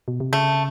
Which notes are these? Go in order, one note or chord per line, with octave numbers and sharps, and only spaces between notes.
B2
C3
C#3 A3